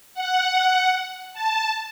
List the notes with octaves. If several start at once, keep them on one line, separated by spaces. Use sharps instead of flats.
F#5
A5